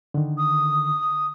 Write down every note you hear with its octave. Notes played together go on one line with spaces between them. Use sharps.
D3 D#3
D#6